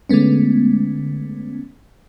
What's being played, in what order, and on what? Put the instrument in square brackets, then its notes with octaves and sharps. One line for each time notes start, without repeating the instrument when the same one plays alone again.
[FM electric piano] D3 G#3 A3 B3 C#4